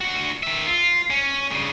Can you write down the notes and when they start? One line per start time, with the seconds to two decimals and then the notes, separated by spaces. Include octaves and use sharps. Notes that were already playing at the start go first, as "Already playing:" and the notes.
0.01 D2 F#4
0.43 D#3 E5
0.66 F4
1.10 C#4
1.51 G2 C#3